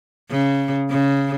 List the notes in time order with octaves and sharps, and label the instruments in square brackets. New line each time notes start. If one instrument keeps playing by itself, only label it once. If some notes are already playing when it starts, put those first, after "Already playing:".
[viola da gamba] C#3
C#3